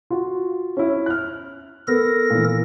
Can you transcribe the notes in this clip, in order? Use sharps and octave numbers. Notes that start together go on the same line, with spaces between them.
F4 F#4
C#4 E4
F6 F#6
B3 A4 A#4 A#6
A#2 E3